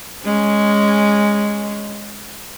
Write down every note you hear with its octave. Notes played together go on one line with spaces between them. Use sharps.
G#3 C#4